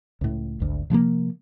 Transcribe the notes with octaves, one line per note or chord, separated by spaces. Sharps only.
C#2 A2
G#1 D2
C3 F3 G#3 A#3